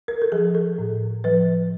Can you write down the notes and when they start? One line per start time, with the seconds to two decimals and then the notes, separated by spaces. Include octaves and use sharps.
0.08 A#4
0.22 A4
0.32 F3 G#4
0.55 A4
0.78 A2
1.24 F3 B4